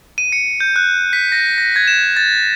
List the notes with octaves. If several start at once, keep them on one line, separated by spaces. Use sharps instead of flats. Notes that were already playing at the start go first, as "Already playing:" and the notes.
D#7
C#7
G6
F#6
B6
A#6
A#6
G#6
E7
A6